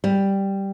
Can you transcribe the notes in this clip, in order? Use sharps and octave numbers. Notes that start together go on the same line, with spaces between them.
G3